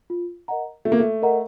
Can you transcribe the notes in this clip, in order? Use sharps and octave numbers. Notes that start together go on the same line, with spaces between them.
F4
A#4 D#5 F#5 A#5
A3 F4
A#3
A3
A#4 D#5 F#5 A#5